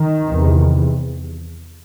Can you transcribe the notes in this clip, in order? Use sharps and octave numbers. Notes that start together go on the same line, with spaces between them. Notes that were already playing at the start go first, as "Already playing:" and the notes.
Already playing: D#3
E2 C3